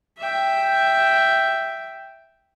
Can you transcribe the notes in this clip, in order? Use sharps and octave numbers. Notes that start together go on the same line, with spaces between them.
E5 G5